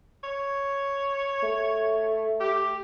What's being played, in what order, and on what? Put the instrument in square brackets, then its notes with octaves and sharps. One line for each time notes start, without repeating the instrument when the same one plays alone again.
[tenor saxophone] C#5
[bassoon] A3
[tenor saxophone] G4